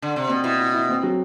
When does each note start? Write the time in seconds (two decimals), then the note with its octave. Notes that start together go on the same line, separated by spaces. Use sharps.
0.02 D3
0.16 C3
0.29 B2 C4
0.44 B2 E4
0.59 E4
0.74 E4
0.89 C4
1.03 F#3